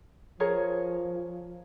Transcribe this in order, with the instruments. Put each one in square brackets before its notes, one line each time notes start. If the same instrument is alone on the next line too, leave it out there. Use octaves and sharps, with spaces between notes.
[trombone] F3 [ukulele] G#4 A#4 C#5